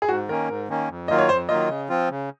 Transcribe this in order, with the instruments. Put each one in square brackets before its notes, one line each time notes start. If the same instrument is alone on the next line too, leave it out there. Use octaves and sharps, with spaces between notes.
[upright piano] G#4
[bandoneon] G#2 [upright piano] F#4
[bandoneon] D#3 A#3 C#4 [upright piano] A#4
[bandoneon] G#2
D#3 A#3 C#4
F2
[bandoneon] D#3 F#3 A#3 F4 [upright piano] D#5
[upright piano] C#5
[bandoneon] F2 [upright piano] C5
[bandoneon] D#3 F#3 A#3 F4 [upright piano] D#5
[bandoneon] C#3
F3 C4 F4
C#3